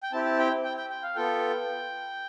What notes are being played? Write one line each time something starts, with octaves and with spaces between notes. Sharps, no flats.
G5
C4 E4 G4 A5
A5
G5
G5
G5
G5
F5
B3 F4 A4 G5